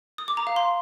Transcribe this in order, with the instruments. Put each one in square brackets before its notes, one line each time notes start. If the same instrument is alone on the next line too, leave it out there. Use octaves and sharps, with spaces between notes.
[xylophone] D#6
D6
A#5
F5
C6